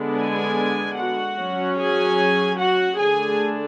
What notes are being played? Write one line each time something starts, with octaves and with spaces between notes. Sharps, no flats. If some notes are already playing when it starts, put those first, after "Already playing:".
Already playing: D3 G#3 B3 D4
G#4 G#5
F#4 F#5
F#3 C#4
G#4 G#5
F#4 F#5
D3 A3 D4 G#4 G#5